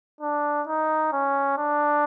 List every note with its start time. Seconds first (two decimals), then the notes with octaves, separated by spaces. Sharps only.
0.21 D4
0.67 D#4
1.12 C#4
1.58 D4